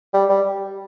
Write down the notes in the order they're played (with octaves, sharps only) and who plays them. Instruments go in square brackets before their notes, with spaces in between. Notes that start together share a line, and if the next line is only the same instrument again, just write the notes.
[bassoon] G3
G3